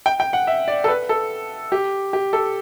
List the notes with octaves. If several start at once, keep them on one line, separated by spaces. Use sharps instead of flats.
G5
G5
F#5
E5
D5
A4
B4
A4
G4
G4
A4